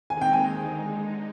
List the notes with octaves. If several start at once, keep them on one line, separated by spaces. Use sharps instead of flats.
D#2 D#3 G#3 C4 D#4 G#5
G5
G#5
D3 G#3 D#4